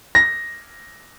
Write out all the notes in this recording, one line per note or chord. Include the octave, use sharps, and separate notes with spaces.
A#6